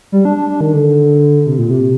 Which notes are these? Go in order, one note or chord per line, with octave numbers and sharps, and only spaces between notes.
G3
D4
D4
D4
D#3
D3
C3
A#2
C3